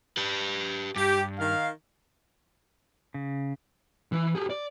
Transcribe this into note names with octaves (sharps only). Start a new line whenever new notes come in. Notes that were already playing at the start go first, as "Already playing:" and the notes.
G4 B4
G2 G4
D#3 F5
C#3
E3
G4 G#4
D5